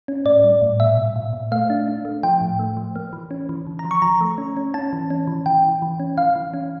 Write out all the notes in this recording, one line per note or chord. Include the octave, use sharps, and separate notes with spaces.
C#4
A2 D5
G3
A2
A#2 E5
A#2
A#2
A#2
A3 F5
D4
D4
A3
F3 G5
A2
A3
F3
A#3
E3
C#4
E3
D3
A#5
F3
C#6
F3 A#5
A3
C#4
C#4
C#4 A5
E3
C#4
E3
E3 G5
E3
E3
C#4
E3 F5
E3
C#4